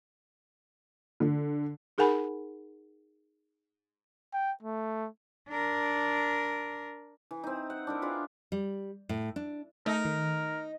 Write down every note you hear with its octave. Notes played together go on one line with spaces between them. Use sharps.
D3
D#4 G#4 A#4 F#5 G#5 B5
G5
A3
D4 A#4
E3
C4 D#4
F#5
D4 E4 A#4
D4 F4 G#4 B4
G3
A2
D4
A3 D#4 A#4
D#3